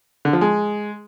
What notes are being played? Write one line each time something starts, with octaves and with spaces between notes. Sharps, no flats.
D3
F3
G#3